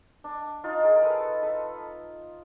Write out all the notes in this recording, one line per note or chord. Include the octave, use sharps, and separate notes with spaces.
D4
D#4 F4
G#4 A#4
A#4
A4 B4
A4 B4